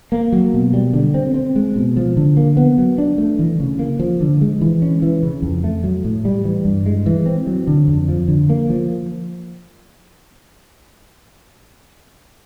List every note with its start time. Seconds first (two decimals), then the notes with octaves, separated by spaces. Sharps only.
0.12 A#3
0.32 F#3
0.54 B2
0.73 G3
0.93 D3
1.14 C4
1.34 C4
1.56 G#3
1.76 B2
1.97 F3
2.17 D3
2.37 A#3
2.57 B3
2.78 F#3
2.98 D4
3.18 A3
3.39 E3
3.60 C#3
3.79 A#3
3.99 F3
4.21 D3
4.41 G#3
4.61 E3
4.82 C#4
5.02 E3
5.23 C#3
5.42 F2
5.64 A3
5.84 F#3
6.05 A2
6.25 G3
6.44 E3
6.65 G2
6.86 G#3
7.06 E3
7.26 C4
7.47 F#3
7.67 D3
7.88 F2
8.08 F3
8.28 D3
8.49 A#3
8.70 F3